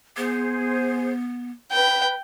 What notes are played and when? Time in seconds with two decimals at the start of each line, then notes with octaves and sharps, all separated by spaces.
0.17 B3 G#4 C5
1.72 B4 G5